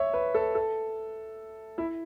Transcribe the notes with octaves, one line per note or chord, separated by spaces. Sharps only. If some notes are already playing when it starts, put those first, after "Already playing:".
Already playing: C#5 E5
B4
A4
A4
E4